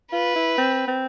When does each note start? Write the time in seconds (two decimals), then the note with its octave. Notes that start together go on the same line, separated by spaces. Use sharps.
0.12 F4 B4
0.36 E4
0.58 C4
0.88 C4